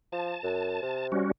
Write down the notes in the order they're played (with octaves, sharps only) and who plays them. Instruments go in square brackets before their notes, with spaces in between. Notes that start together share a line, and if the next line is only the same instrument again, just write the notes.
[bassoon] F3 [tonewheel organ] A5
[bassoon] F#2
C3
[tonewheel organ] G3 C#4 F#4